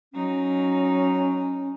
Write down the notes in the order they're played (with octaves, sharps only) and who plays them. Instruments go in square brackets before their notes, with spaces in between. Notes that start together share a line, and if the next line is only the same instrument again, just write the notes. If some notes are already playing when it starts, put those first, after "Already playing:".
[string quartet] F#3 D#4 [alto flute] C#4